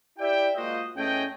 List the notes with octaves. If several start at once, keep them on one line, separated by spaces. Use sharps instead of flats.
E4 G4 D5 E5 G5
G#3 A#3 F4 F#4 C5 D#5
E2 A3 C#4 G#4 D#5 G5